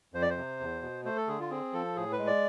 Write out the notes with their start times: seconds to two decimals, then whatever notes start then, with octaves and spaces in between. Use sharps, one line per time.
0.14 F2 C5
0.22 D5
0.30 C5
0.37 C3
0.60 E2
0.82 B2
1.05 A3 C5
1.17 A4
1.28 D3 G#4
1.40 F4
1.50 C4 G#4
1.73 F3 A4
1.96 A2 G#4
2.12 B4
2.19 G#3
2.27 D5